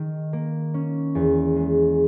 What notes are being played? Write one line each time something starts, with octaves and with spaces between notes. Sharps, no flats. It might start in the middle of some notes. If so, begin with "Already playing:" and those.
Already playing: D#3
A#3
C#4
E2
G#3